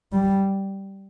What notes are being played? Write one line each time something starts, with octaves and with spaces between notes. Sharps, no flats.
G3